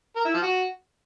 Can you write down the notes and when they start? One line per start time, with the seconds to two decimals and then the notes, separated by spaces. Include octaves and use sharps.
0.16 A#4
0.25 E4
0.33 F3
0.42 F#4